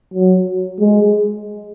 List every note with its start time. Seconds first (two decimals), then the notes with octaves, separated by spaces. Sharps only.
0.14 F#3
0.80 G#3